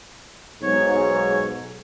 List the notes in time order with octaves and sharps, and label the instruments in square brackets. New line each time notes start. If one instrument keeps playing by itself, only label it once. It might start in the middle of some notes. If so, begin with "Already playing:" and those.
[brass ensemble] B1 G#2 [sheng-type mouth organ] C#5